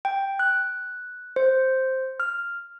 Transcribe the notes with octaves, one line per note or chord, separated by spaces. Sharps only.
G5
F#6
C5
F6